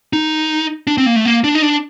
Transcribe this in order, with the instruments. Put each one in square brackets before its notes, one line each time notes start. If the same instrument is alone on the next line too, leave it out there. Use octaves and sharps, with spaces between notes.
[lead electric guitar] D#4
D4
C4
A#3
A3
A#3
D4
D#4
D4